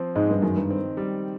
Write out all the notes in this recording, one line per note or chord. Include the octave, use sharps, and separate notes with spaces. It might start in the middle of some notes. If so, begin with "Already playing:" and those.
Already playing: F3 C4
G#2 G#3
G2
F#2 D#3
G2
C4
G3